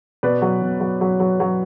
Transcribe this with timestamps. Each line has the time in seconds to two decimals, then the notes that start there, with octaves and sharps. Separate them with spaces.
0.23 B2 B4 D5
0.42 F#3
0.62 B2
0.81 F#3
1.01 F#3
1.20 F#3
1.40 F#3